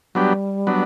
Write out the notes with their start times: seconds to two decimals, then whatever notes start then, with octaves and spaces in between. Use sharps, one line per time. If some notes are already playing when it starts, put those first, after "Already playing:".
0.15 F#3 G3 B3 D4 G4
0.67 F#3 B3 D4